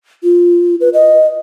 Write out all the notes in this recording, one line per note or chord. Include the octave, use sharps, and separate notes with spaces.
F4
B4
D#5